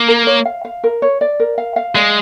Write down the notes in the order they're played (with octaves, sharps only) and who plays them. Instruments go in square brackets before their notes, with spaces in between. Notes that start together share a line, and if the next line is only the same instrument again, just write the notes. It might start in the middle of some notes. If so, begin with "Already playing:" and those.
Already playing: [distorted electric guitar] A#3
[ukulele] A#4
C#5
F5
F5
A#4
C#5
D5
A#4
F5
F5
[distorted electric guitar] G#3 [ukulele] D5